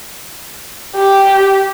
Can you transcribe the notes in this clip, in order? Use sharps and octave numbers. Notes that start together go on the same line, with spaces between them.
G4